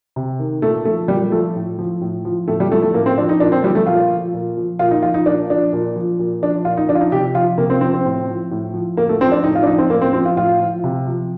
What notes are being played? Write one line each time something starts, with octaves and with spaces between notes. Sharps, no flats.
C3
D#3
A#2 A3
F3 A3
A#2 G3
F3 A3
A2
F3
A2
F3
A2 A3
G3
F3 A3
A3
A2 A#3
C4
F3 D4
D#4
A#2 D4
C4
F3 G3
A3
A#2 F4
F3
A#2
F3
A#2 F4
D#4
F3 F4
D#4
A#2 D4
F3 D4
A#2
F3
A#2
F3 D4
A#2 F4
D#4
F3 D4
F4
D#4
C3 G4
F3 F4
C3 A#3
C4
F3 C4
C4
A2
F3
A2
F3
A2 A#3
A3
F3 C4
D4
A2 D#4
F4
D4
F3 D#4
C4
A2 A#3
C4
F3 C4
F4
A2 F4
F3
C3
F3